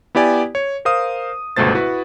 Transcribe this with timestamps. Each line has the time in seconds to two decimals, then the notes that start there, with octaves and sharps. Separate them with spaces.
0.15 B3 E4 G4 D5 G#5
0.55 C#5
0.85 A#4 C5 F5 D#6
1.57 G1 C#2 B2 A3 C5 A6
1.75 E4 F#4 B4